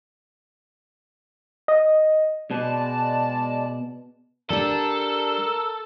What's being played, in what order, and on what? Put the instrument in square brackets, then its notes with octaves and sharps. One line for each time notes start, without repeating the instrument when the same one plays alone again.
[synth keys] D#5
[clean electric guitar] B2 [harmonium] G#3 D5 [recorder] A5
[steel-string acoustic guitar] G3 D4 [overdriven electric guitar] A4 [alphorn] A#4